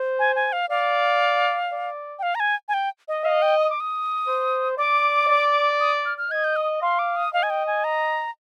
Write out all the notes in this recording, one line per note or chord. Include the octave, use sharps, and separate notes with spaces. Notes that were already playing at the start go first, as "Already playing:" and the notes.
Already playing: C5
G#5
G#5
F5
D5 F5
D5
G5
F5
A#5
G#5
G#5
G5
D#5
D#5 F5
G5
D#6
D6
D#6
C5
D5 D6
D5
D#6
F6
F6
D#5 G#6
G6
D#6
F5 C6
D6
D#6
D#5 F5
G#5
G5
G#5
A#5